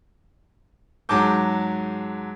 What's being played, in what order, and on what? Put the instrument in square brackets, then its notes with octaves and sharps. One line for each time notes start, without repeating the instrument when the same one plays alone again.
[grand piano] G#2 F#3 G#4 A5 D6 G6